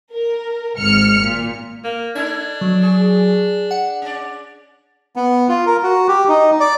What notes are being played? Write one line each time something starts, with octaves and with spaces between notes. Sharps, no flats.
A#4
G#1 G#2 F6 C#7
A#2
A#3
D4 D#4 A4 G#6
F#3
G#4
F#5
C#4 D5
B3
F4
A#4
F#4
G4
D#4
D5